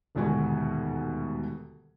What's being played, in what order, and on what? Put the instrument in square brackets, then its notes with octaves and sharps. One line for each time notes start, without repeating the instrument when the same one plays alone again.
[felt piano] D#1 D2 G#2 B2 F#4 G#5